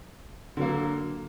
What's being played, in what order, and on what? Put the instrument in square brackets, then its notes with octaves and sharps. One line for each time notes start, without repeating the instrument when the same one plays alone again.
[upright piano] D3 F#3 A#3